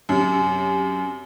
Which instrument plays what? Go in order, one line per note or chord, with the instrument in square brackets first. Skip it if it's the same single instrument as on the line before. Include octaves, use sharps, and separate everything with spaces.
[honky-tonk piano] F#2 C3